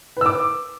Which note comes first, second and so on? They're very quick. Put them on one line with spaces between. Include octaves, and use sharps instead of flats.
B4 E6 D6